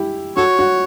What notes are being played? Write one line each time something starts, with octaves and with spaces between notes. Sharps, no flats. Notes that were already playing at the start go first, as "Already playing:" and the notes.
Already playing: E4 G4
F#4 A4 C#5
F#4